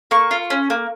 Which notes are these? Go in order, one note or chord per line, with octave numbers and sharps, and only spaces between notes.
A#3 C#6
F4
C#4
A#3